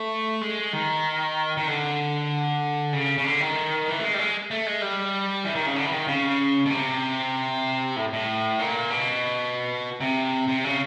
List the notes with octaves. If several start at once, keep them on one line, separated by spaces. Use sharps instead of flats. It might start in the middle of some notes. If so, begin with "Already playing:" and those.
Already playing: A3
G#3
D#3
D#3
D3
C#3
C#3
D3
D#3
E3
A3
G#3
G3
G#3
A3
G#3
G3
E3
D#3
C#3
D3
E3
D#3
C#3
B2
C3
A2
A2
A#2
B2
C3
C3
C#3